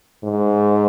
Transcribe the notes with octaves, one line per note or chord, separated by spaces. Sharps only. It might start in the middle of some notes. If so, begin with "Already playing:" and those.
G#2